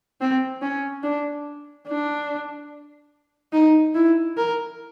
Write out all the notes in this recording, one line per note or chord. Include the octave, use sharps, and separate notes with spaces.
C4
C#4
D4
D4
D#4
E4
A#4